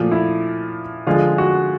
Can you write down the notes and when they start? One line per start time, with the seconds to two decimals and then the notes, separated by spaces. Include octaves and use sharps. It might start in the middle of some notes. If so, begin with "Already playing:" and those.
Already playing: A#2 F3 A3
0.12 E4
1.07 D3 F3 G#3 F4
1.38 F#4